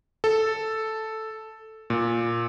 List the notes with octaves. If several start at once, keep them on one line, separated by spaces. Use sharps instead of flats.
A4
A#2